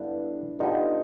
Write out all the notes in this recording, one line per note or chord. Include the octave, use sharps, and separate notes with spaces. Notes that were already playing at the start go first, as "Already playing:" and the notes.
Already playing: G2 D3 G3 B3 D4 E4
G2 D3 G3 B3 D#4 F4